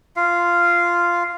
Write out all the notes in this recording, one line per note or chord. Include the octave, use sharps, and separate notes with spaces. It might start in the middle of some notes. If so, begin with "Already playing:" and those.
F4 F5